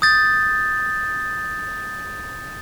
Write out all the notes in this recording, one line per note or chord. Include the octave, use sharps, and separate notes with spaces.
D#6 G6 A6